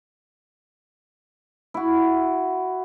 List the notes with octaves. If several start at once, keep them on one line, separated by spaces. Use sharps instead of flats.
E4 F#4